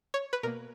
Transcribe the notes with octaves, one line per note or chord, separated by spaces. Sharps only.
C#5
B4
B2 A#3 A#4